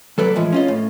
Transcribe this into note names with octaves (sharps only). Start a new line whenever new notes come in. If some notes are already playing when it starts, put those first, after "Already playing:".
F#3 A4 B4 D5
A2 E3 F3 G#3
C#4 F4 D#5
A2